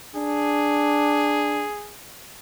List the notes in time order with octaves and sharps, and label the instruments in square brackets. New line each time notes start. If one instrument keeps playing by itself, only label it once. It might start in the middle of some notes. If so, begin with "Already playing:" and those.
[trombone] D4 [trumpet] G#4